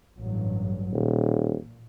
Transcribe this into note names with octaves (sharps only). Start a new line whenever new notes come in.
A1 G2 F#3
D#1 A#2